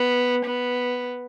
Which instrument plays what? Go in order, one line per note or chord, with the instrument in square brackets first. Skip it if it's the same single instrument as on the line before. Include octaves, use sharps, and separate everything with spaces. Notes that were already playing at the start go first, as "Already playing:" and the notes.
Already playing: [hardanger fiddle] B3
B3